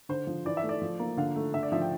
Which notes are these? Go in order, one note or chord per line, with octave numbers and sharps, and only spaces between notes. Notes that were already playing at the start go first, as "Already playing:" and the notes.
D3 C5
F3
E3 D5
E5
A3
D5
F3
A#3
D3 F5
A3
D3 E5
D5
F3 E5
G5